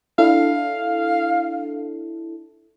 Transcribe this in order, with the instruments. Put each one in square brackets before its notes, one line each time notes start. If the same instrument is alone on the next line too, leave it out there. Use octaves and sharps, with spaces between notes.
[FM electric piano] D4 E4 A4 [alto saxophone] F5